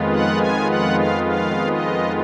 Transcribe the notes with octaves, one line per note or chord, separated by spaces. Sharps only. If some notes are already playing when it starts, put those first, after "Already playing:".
Already playing: F2 D#3 G#3 B3 F4
F#5
G#5
F#5
F5
F5
D#5